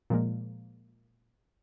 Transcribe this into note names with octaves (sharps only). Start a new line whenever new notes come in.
A#2 F3 G#3 A#3